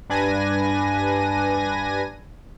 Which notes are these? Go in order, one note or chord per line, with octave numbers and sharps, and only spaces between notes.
G2 D4 B4 G#5 A#6 D#7